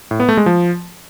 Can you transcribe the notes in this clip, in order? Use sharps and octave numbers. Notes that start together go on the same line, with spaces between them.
A2
B3
A3
G#3
F3